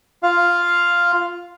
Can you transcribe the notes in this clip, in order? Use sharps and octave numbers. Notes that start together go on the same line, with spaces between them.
F4 F5